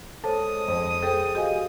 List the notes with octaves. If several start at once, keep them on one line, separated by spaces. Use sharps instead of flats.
G#3 A4 C5 C#5 A5 D#6
F2 D#7
G#4 A4 C5 G5
F#4 G4 D#5 F5 G#5